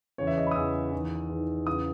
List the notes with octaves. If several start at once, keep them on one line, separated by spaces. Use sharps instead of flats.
E2 C#3 E3 C#5
E5
D#5
B5
D#6
E2 C#3 E3 E6
E2 D#3
E2 D#3
E2 C#3 E3 D#6